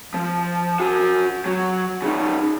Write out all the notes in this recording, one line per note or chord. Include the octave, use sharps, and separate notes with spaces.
F3
F#4 G#5
F#3
C#3 D#4